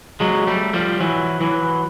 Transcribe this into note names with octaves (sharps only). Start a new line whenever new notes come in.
F#3 G#3
G3 A3
F3 G3
E3 F#3
E3 F#3